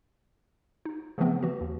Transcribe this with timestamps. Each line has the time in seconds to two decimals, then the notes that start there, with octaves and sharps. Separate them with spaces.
0.85 D#4
1.18 C#3 E3 F3 A3 B3 C4
1.43 E3 F#4
1.61 D#2